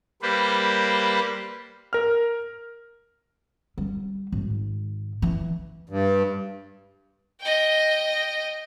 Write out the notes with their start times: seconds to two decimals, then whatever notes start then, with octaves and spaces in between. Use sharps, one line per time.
0.22 G3 A#3 B4 C5
1.93 A#4 F6
3.78 G3
4.32 G#1
5.22 E3
5.89 G2
7.40 D#5 G5